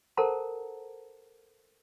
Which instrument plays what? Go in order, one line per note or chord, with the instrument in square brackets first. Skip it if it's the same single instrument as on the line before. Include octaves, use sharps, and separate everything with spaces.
[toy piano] A4 A#4 C5 F#5 A5 A#5